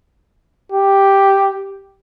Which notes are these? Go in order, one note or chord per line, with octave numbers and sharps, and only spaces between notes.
G4